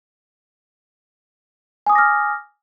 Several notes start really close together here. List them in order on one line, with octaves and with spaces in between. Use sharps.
G#5 D#6 D6 A#6 F6